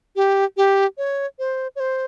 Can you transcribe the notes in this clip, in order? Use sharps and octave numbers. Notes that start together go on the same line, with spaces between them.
G4
G4
C#5
C5
C#5
C5